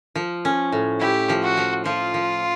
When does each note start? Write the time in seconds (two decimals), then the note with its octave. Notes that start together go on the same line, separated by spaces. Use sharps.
0.15 F3
0.45 C#4
0.72 A2
1.01 E4 G4
1.29 F3
1.43 F#4
1.57 F3
1.85 F3 F4
2.14 F3